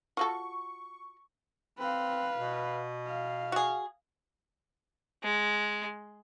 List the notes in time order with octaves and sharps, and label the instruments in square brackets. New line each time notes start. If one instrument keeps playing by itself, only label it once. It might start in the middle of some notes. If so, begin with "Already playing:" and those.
[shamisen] F4 F#4 A4 [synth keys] C#6
[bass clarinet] C4 [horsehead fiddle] B4 F5
[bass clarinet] B2
[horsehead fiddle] F5
[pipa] F#4 G#4
[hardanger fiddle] G#3